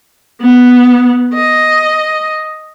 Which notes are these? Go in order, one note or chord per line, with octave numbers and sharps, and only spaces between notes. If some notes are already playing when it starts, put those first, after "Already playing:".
B3
D#5